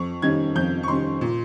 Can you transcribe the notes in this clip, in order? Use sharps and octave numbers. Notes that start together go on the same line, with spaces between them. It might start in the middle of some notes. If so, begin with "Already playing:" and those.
Already playing: F2 C#6
D#3 G3 C#4 G#6
F2 G6
C#6
D#3 G3 C#4 C6
A#2